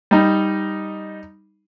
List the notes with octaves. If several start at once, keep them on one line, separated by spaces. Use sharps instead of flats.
G3 D#4